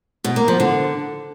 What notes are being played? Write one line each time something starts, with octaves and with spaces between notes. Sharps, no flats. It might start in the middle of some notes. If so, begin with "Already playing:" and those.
B2
A#3
F3
D3